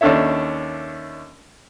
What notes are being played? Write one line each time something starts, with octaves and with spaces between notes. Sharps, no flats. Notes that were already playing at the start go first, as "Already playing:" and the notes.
D#2 C#4 D4 A4 C#5 E5